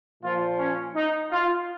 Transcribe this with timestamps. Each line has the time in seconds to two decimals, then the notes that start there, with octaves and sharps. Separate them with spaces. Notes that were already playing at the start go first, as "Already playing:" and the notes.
0.22 A#2 F3 F4
0.59 C#4
0.95 D#4
1.31 F4